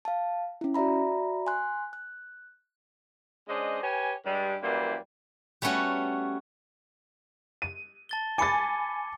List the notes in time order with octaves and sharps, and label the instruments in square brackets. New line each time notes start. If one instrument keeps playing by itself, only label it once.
[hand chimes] F5 A5
C#4 E4
F#4 D5 E5 A#5 B5
G#5 C6 F#6
F#6
[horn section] G#3 C#4 D4 C5 D#5
G4 B4 C#5 G#5
G2 G3 G#3
F#2 E3 G3 A#3 B4 C5
[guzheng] G3 A3 B3 C#4 F#4
[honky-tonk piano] D#7
[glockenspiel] A5 A6 G7
[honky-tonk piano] G#5 B5 A6 [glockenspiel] D6 C#7